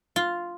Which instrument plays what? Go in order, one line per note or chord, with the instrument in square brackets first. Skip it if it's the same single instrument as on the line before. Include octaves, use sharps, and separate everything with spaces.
[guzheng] F4